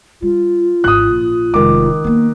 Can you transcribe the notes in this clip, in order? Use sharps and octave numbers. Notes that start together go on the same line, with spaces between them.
G3 F4
G#1 E3 D#6 F#6
A#1
F1 D#3 G#3 D6
A#3 B3